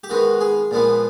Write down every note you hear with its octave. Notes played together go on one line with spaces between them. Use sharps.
G4
D#3 G#3 B3 F#4
G#4
A#2 F3 G#3 B3